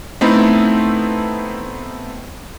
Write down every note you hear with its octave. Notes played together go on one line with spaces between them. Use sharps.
A3 B3 C4 D#4 E4 A4